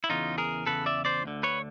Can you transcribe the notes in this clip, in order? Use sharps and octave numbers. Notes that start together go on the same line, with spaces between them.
E4
E2 C#3 E3 D#4 F4
G#4 A#4
E2 C#3 E3 A4 B4
D5 E5
C5 D5
D2 D3
B4 C#5